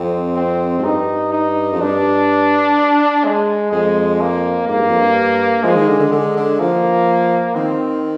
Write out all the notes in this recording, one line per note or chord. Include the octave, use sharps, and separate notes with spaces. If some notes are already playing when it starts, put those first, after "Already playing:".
Already playing: F2 C4
C4
G#2
G2 D#4
D#4
F2
G2 D4
G#3
F2 G#3
A#3
G#2 A#3
G2
F2
G2
F3 G#3
D#3
D3
D3
D3 G#3
D3
F3 A#3
D#3 C4